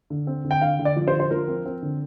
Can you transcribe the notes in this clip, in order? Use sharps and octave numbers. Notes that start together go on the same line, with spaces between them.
D3
C4
D3
G5
D3 F5
D3
D5
F3
C5
D3
C5
F3 A#4
C4
C4
D3